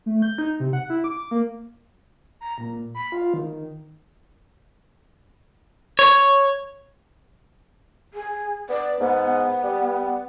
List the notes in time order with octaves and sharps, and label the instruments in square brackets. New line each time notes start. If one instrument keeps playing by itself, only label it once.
[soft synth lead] A3
G6
D#4
C3
F#5
E4
D6
A#3
A#5
A#2
B5
F4
D#3
[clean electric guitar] C#5
[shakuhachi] G#4
[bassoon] B3 [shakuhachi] D5
[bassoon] G#2 [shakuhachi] B3
[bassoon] G3